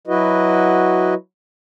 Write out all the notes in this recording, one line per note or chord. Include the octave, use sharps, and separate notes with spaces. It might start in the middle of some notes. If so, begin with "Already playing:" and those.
F#3 E4 F#4 B4 D#5